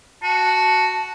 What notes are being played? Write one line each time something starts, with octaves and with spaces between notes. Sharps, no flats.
F#4 A5